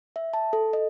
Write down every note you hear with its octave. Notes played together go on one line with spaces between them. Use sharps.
E5
A5
A4
D#5